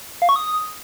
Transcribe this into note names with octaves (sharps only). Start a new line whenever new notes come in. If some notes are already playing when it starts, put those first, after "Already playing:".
F5
C#6
D#6